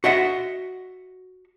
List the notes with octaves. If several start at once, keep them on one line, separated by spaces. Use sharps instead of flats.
F#4 D#5 E5 F#5